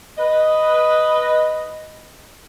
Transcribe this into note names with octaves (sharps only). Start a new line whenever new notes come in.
B4 D#5